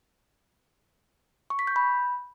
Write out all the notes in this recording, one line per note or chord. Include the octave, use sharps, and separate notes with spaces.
C#6
B6
G6
B5